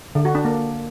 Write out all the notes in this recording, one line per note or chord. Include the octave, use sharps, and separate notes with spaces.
D3
F#4
D4
A#3